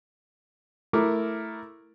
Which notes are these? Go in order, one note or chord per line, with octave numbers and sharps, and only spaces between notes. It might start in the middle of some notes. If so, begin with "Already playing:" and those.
A3 E4 A#4 D6